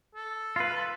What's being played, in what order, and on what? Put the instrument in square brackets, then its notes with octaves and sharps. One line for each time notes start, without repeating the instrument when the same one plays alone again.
[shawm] A4
[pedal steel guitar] F4 B4
B4